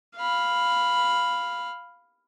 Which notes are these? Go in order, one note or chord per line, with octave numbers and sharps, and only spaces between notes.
F5 B5